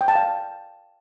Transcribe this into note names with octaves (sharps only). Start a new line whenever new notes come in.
G5
A5
F5